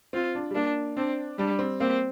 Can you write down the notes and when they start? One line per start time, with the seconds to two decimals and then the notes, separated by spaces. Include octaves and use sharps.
0.13 C4 F4
0.35 D4
0.51 G3
0.55 A#3 D4
0.97 C4 D4
1.38 G3 D4
1.59 C4
1.80 A#3 C4